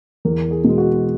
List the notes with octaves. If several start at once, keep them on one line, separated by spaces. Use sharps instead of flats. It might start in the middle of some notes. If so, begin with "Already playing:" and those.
E2 A#4
G#4
B2 G#3
F#4